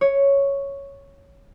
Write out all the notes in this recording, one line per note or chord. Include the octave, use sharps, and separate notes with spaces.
C#5